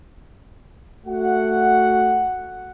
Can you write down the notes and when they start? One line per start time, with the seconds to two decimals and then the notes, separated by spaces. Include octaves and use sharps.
1.07 A3 F#4 F#5